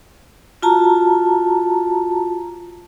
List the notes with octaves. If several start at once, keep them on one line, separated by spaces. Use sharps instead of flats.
F4 F#4 A5 A#5